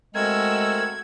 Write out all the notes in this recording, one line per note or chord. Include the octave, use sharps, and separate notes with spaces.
G#3 A3 C4 F#4 A#4 E6 G#6